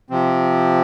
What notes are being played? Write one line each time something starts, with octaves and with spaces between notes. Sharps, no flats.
C3 F3 C4